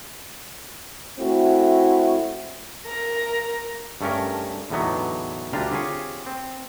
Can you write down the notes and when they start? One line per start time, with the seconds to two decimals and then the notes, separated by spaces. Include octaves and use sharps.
1.18 A3 C4 E4 F#4
2.86 A#4 A#5
4.01 G2 A3 C#4 A#4
4.70 E2 A2 D3 F#3 B3 D#4
5.53 D2 G3 D4 F4 A#5
5.71 C4 F4 G4 G#4 C#5
6.26 C4